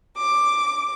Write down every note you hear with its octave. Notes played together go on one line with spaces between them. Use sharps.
D6